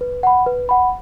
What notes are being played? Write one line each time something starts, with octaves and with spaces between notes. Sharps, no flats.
B4
F#5 B5
B4
F#5 B5